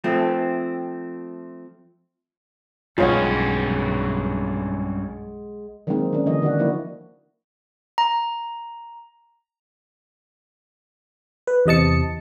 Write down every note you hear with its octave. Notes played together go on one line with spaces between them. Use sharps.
F3 A3 C4
B1 G2 G#3 C#4 F4 C#5 F#5
D#3 F#3 G#3 A#3 C4 D#4
D#3 C#4 D4
D3 E3 A#3 D#5
D#3 D4 F#4 D5 F#5
F3 A#3 D4 E4
A#5
B4
E2 C3 D#5 A5 C#7